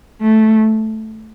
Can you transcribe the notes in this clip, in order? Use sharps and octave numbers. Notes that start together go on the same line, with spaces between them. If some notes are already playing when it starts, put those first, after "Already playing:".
A3